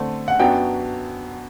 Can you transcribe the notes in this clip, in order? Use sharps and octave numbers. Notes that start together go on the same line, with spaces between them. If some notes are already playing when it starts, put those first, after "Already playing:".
Already playing: D3 A3 C4
F#5
F#2 F#3 B3 D4 G5